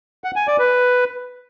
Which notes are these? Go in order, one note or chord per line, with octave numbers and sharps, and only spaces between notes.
F#5
G#5
D5
B4